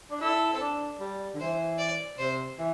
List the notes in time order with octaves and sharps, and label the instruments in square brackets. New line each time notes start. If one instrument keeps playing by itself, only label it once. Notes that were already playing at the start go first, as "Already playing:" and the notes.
[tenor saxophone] D4
[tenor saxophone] E4 [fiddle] A4
[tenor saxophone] C4
D4
G3
D3
[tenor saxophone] E3 [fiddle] C5
[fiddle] D5
[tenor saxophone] C3 [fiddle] C5
[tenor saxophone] E3